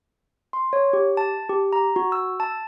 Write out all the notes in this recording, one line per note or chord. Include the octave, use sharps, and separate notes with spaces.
C6
C#5
G4
A5
G4
A#5
F#4
E6
A5